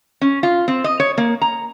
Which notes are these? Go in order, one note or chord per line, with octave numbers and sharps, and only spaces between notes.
C#4
F4
C4
D#5
C#5
A#3
A#5